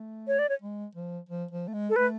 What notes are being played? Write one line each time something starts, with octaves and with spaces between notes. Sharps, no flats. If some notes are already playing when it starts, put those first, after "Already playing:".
Already playing: A3
C#5
D5
C#5
G#3
F3
F3
F3
A3
G#3
A4
A3 B4